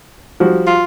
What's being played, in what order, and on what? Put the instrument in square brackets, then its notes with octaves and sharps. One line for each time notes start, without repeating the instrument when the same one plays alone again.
[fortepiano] F3 G3 F#4
[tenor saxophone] F4